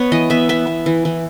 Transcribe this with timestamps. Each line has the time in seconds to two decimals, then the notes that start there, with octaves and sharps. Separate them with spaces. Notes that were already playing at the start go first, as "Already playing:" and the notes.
Already playing: B3 B4 C#5
0.12 E3 D#5
0.30 B3 E5
0.49 B3 E5
0.67 B3
0.86 E3
1.05 E3